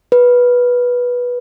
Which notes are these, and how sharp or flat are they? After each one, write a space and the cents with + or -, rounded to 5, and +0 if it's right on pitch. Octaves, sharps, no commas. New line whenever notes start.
B4 -15